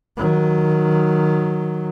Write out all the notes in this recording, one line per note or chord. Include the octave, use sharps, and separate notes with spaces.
D#3 F#3